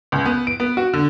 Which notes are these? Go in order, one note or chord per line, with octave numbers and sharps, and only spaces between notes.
C#2
B3
D7
B3
F#4
D3